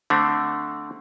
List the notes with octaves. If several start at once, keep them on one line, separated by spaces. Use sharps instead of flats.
D3 A3 C4